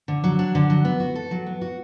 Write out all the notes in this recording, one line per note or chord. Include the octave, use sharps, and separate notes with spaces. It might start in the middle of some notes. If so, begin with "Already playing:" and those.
D3
F#3
D4
D3
F#3
B3
F#4
A4
F#3
B3
F#4